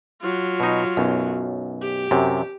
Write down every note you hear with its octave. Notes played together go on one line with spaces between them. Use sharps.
F#3 F4
B2 D#4
B1 F#2
G4
F#2 C3